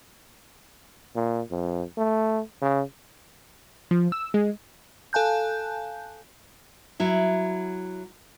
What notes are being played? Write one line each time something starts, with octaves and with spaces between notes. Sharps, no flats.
A#2
F2
A3
C#3
F3
E6
G#3
A4 F5 G#5 A5 F#6 G6
F#3 E4